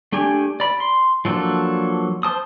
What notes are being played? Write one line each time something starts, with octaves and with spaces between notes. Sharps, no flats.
A3 D4 G4 G#5
D5 B5
C6
F3 F#3 A#3 D4 A4
C5 A5 D#6